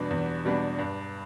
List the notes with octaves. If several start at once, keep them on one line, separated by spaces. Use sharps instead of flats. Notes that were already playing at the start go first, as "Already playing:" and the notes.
Already playing: E2 B2 G3 B3 D4
E2
B2 G3 B3 D4
G2